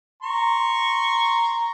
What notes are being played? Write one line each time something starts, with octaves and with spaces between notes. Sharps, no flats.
A#5 C6 C#6